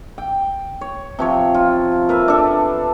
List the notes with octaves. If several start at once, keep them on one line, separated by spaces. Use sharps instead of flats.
G5
C#5
C3 F3 C#5
F4
A#4 B4 E5
D4 A4